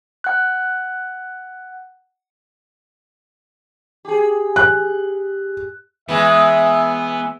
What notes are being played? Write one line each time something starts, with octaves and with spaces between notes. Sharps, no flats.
F#5 F#6
G4 G#4
F#6
E3 G#3 B3 E5